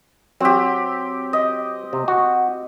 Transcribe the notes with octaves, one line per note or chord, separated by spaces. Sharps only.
F#3 C4 G4
D#5
C3
F#4